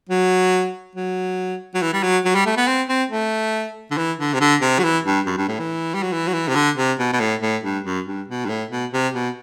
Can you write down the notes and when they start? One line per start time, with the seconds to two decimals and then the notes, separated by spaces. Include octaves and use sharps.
0.09 F#3
0.95 F#3
1.75 F#3
1.82 E3
1.93 G3
2.03 F#3
2.25 F#3
2.35 G3
2.46 A3
2.57 B3
2.67 C4
2.89 C4
3.10 A3
3.91 D3
3.97 E3
4.19 D3
4.33 C3
4.40 D3
4.61 C3
4.79 F#3
4.84 E3
5.05 G2
5.26 F#2
5.37 G2
5.48 A2
5.59 E3
5.94 G3
6.03 F#3
6.13 E3
6.28 F#3
6.34 E3
6.48 C3
6.55 D3
6.77 C3
6.99 B2
7.13 B2
7.20 A2
7.42 A2
7.64 G2
7.84 F#2
8.07 G2
8.28 B2
8.45 G2
8.49 A2
8.71 B2
8.93 C3
9.14 B2